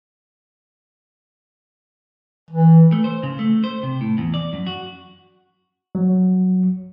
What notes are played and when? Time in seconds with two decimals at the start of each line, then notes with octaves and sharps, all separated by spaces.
2.51 E3
2.92 A3
3.04 C5
3.23 C#3
3.39 A3
3.64 C5
3.83 C3
4.01 A2
4.18 E2
4.34 D5
4.53 F#2
4.67 F#4
5.95 F#3